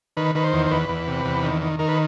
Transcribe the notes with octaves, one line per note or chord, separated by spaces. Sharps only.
D#3 B4
D#3 B4
C5
E2
C5
E2 B4
E2
C3
E2
D#3
D#3
D#3 A#4
B4